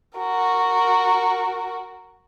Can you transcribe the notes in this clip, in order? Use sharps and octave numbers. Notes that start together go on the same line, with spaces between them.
F#4 A#4